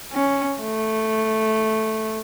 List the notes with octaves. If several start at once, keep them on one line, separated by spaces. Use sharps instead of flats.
C#4
A3